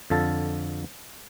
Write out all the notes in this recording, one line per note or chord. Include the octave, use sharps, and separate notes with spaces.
F2 D3 F4 A4 A5